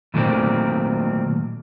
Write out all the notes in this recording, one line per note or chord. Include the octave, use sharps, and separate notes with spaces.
A#2 D#3 F#3 A3 A#3 C4